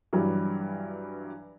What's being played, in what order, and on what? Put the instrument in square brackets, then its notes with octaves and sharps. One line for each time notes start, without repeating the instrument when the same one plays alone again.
[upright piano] G2 E3 F#3 G3